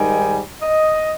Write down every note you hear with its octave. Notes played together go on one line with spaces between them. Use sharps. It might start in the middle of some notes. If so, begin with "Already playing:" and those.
Already playing: G#2 D#3 G3 G#5
D#5